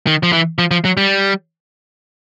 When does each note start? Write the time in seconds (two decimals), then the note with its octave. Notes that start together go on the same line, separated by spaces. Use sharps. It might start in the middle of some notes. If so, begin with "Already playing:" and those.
0.07 D#3
0.23 F3
0.33 E3
0.59 F3
0.71 F3
0.85 F#3
0.97 G3